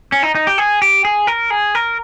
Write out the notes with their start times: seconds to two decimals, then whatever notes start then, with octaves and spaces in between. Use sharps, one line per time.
0.12 C#4
0.23 D#4
0.35 D#4
0.47 G4
0.58 G#4
0.82 G4
1.05 G#4
1.27 A#4
1.50 G#4
1.75 A#4